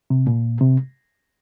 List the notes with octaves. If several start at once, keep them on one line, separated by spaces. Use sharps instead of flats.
C3
A#2
C3